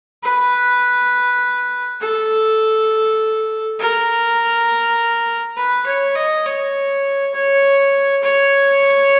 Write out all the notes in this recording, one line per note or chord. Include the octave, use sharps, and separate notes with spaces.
B4
A4
A#4
B4
C#5
D#5
C#5
C#5
C#5